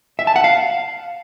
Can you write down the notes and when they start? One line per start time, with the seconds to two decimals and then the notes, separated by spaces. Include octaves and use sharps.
0.19 E5
0.27 A5
0.36 F#5
0.44 F5